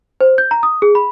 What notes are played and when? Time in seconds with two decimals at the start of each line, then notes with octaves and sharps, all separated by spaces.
0.21 C5
0.38 G6
0.51 A#5
0.63 D#6
0.82 G#4
0.95 B5